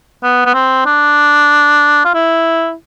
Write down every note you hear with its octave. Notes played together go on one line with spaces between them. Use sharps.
B3
B3
C4
D4
F4
E4